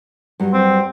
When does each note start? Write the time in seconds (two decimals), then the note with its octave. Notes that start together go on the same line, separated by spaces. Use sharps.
0.40 G2 F#3 G3
0.53 C4